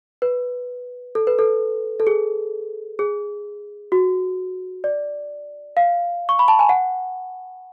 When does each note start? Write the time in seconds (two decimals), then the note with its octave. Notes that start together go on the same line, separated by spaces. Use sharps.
0.22 B4
1.15 A4
1.27 B4
1.39 A4
2.00 A4
2.07 G#4
2.99 G#4
3.92 F#4
4.84 D5
5.77 F5
6.29 C#6
6.39 B5
6.48 A5
6.59 G#5
6.69 F#5